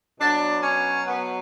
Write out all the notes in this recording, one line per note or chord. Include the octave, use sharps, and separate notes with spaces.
B2 F#3 B3 D4
C#4
B3